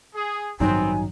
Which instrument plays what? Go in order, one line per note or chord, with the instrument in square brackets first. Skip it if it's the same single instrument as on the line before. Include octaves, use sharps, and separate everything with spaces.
[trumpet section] G#4
[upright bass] A1 G2 [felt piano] D#3 F#3 D#4 [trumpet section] B3 C4 [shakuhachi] G#5